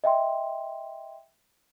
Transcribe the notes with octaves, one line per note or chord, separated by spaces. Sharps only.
D#5 E5 G5 C6